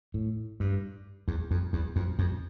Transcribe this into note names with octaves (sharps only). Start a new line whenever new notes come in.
A2
G2
E2
F2
E2
F2
F2